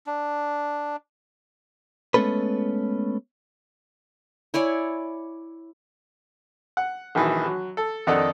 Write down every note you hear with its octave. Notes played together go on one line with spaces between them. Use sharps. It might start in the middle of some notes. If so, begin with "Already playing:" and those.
D4
G#3 A3 B3 C#4 A4 B4
E4 C#5 D5 G#5
F#5
A#1 D#3 E3 F#3
F#3
A4
F2 D#3 D4 D#4 A4 F#5